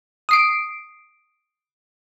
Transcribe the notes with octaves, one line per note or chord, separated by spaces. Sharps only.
D#6 C7 D7